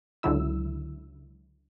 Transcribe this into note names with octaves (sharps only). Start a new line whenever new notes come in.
C#2 D3 F#3 E4 E6